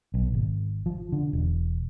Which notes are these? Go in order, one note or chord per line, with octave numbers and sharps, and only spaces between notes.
B1
G#1
F3
D3
E1